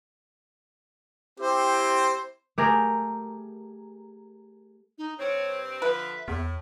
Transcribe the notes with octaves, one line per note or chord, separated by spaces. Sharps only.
C4 E4 G4 C5
A3 G4 G#4 A#4
D#4
G2 C4 C#5
D3 F3 B4 E5
E2 A2